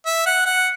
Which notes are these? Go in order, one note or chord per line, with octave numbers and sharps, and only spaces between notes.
E5
F#5
F#5